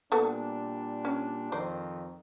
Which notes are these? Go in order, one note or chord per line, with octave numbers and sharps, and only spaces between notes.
A#2 G3 B3 D4 A4 F#5
C#4
F2 D#3 C5 D5